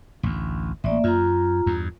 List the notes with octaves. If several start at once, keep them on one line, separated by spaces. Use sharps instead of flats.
A1 D2
A1 A#3 D5 E5
F#2 F4 A#5
E2 G2